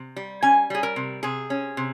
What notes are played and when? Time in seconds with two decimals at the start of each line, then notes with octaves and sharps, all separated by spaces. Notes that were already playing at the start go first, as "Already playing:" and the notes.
Already playing: C3
0.16 G3
0.43 C#4 G#5
0.70 G3 G#4
0.83 A#4
0.96 C3
1.23 C3 G#4
1.50 C#4
1.77 C3